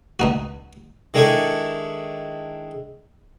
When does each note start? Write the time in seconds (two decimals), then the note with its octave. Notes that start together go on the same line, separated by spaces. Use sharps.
0.20 C#2 D#4 F#4
1.14 D#3 G#3 D4 E4 A4 C#6